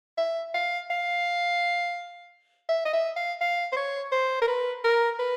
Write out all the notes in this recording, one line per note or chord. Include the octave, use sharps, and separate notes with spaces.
E5
F5
F5
E5
D#5
E5
F5
F5
C5
C#5
C5
A#4
B4
A#4
B4